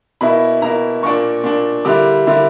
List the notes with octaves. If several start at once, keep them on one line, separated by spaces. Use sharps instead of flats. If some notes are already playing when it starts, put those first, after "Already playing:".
B2 A#3 E4 B5
B2 A#3 E4 A#5
A#2 A#3 D4 C#6
A#2 A#3 D4
D3 G3 A#3 E4 D6
D3 G3 A#3 E4